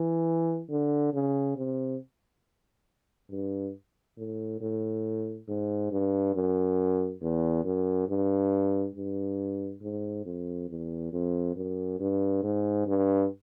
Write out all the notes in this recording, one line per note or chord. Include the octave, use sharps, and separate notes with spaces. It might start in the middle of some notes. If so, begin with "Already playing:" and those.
Already playing: E3
D3
C#3
C3
G2
A2
A2
G#2
G2
F#2
E2
F#2
G2
G2
G#2
F2
E2
F2
F#2
G2
G#2
G2